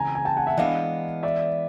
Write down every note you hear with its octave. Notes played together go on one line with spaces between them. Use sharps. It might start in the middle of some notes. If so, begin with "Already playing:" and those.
Already playing: C#3 E3 G#3 C4 G#5 A#5
G#5
G5 A5
F#5 G#5
E5 F#5
E3 G#3 B3 D4 D#5 F5
D5 E5